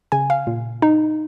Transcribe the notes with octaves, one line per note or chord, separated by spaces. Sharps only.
C#3 G#5
F5
A#2
D#4